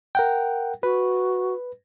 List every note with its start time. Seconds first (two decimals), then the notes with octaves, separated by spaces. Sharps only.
0.15 A#4 F#5 G5
0.83 F#4 B4